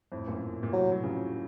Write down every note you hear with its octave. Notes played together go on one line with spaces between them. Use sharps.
F2 A2
F#2 A#2
A#2
A2 C3 F#3
F#3
C#3 F3